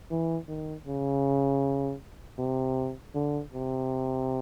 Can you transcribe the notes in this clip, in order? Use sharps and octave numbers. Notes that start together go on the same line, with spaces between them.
E3
D#3
C#3
C3
D3
C3